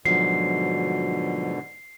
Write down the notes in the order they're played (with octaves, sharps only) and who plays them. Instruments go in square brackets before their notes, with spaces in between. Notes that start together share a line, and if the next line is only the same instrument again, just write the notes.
[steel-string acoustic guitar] D2 F3 F#3 [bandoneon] G#2 B2 D3 [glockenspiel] C7